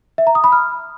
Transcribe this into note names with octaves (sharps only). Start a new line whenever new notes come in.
E5
A#5
D#6
B5
F6